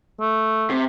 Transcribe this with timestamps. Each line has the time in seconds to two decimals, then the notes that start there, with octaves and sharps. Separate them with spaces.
0.20 A3
0.70 C3